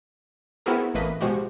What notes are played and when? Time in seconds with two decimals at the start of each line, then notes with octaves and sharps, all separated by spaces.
0.66 B3 C4 E4 F#4 G#4 A#4
0.94 A1 A3 A#3 B4 D#5 B6
1.21 B2 F3 G#3 F#4 G4